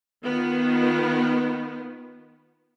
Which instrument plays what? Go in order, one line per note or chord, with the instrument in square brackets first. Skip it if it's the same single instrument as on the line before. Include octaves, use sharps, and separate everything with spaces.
[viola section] D#3 B3 F4